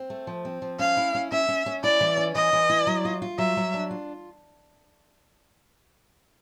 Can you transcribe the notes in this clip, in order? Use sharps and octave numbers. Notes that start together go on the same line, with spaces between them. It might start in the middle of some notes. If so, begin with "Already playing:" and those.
Already playing: C4
A3
F3
C4
F3
C#4 F5
E4
C#4
C#4 E5
C#4
C#4
E4 D5
E3
C#4
E3 D#5
E3
E4
F#3
F4
F4
F#3 E5
F#3
D4
F4